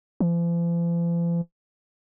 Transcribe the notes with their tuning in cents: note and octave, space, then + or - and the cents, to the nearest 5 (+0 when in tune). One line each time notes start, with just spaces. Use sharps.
F3 -45